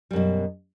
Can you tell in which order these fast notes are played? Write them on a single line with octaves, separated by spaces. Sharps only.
G3 F#2 B2